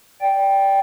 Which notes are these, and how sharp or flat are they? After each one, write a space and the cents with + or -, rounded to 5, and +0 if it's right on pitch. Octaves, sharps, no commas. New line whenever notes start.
D5 -15 G5 +0